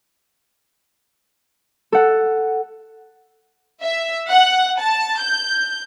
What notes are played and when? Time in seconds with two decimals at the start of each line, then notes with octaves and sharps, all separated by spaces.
1.92 A4 F#5
3.82 E5
4.31 F#5
4.80 A5
5.21 G6